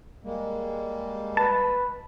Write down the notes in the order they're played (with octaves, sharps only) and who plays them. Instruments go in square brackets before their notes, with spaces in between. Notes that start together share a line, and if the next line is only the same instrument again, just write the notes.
[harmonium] G3 G#3 A#3
[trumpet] B4 [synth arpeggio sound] A5